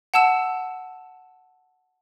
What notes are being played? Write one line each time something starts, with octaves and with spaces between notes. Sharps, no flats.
F#5 A5 E6 E7